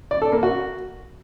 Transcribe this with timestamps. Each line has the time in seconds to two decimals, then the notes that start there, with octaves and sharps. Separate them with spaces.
0.11 D5
0.22 A4
0.32 A#3
0.43 F#4